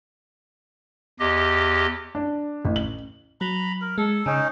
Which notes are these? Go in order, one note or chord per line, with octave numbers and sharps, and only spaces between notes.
E2 G4 D#5
D4
A1
F#7
F#3 A#5 B5
A#4
G#3 A4
C#3 C#4 D#4